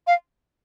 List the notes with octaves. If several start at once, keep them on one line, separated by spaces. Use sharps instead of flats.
F5